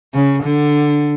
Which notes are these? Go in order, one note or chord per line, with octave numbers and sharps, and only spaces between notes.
C#3
D3